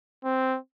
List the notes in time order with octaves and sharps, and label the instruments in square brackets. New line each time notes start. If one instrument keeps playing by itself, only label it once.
[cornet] C4